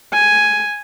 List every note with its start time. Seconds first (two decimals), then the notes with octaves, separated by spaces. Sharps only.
0.13 G#5